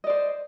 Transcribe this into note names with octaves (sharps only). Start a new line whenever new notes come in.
C5 D5 D#5